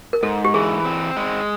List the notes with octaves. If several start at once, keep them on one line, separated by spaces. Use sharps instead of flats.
A#4
G#2 A4
G4
E3 G#4
C4
G#3